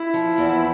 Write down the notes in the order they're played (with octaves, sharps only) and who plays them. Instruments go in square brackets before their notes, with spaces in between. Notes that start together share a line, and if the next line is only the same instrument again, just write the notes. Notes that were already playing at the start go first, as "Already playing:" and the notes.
Already playing: [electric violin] E4
[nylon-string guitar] F3
E2